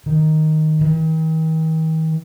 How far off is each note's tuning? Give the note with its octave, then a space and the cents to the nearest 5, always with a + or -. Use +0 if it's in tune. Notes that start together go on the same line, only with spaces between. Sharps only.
D#3 +0
D#3 +45